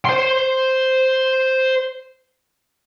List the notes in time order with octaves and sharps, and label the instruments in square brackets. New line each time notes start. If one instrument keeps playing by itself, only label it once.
[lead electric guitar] C5 C6